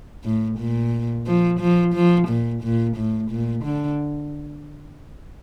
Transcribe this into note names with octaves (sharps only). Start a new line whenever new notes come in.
A2
A#2
F3
F3
F3
A#2
A#2
A2
A#2
D3